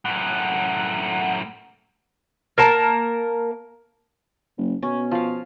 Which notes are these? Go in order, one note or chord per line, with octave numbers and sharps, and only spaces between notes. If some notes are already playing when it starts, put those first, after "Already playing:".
F#2 A2 F#5
A#3 A#4 A5
F#1
B2 C#4
F3 F5